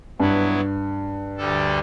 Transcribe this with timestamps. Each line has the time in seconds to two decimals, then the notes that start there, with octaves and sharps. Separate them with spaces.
0.19 G2 F#3 B3 E4
1.37 D2 D3 G3 D4 A4